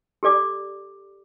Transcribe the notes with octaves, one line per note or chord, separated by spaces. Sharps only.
G4 A4 D5 D6